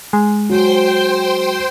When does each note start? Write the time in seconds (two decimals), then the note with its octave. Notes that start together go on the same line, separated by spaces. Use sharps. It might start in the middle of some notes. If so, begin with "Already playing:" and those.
0.13 G#3
0.49 F#3 C5 G5 C6